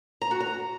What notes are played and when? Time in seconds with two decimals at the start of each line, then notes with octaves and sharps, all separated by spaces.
0.22 A#5
0.31 F#4
0.40 A#5